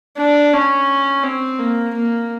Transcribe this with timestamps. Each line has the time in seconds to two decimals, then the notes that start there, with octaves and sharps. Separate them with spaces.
0.17 D4
0.53 C#4
1.23 C4
1.59 A#3
1.94 A#3